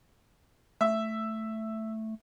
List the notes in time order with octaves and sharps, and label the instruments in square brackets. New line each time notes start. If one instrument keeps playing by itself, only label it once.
[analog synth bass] A3 [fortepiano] E5